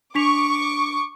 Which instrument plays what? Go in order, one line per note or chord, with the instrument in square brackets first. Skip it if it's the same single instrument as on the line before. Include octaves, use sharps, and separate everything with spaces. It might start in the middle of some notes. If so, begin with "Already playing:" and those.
[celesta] D4 B6 F7 [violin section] C#6 D6